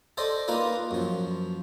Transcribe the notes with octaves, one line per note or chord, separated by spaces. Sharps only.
A4 C5 D5 D#5
A#3 D#4 F4 B4 D#5
F#2 F3